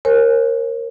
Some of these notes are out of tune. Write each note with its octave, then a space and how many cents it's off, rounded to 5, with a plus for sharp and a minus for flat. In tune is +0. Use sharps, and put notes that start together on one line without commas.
A#4 +0 C#5 -45 G#5 +0